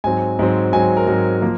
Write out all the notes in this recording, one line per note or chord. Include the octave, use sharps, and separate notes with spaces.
G#2 F#3 C4 G#5
G#2 F#3 C4
G#2 F#3 C4 G#5
A#4
G#2 F#3 C4 A#4
F3 A#3